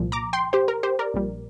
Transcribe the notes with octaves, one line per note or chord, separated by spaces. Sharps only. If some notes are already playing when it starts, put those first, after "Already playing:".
Already playing: C2 A#2 F3
A#5 D6
G5 C6
G4 C5
A#4
G4 C5
A#4 D5
A#1 A#2 G3